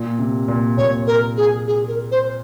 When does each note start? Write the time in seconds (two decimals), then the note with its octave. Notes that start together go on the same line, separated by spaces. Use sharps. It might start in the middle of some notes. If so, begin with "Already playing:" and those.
Already playing: A#2
0.19 C3
0.48 A#2
0.78 A#2 C#5
1.07 A#4
1.37 G#4
1.67 G#4
1.88 A#4
2.11 C5